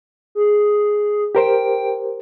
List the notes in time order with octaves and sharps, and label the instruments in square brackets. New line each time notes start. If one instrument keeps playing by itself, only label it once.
[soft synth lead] G#4
[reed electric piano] G4 A#4 C5 [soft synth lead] G5